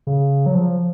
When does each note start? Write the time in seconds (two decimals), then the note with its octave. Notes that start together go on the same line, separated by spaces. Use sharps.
0.07 C#3
0.46 F#3
0.55 F3